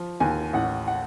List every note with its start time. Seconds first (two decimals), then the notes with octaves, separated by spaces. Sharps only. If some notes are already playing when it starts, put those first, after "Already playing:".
Already playing: F3
0.20 D#2 G#5
0.53 A1 F#5
0.88 F#5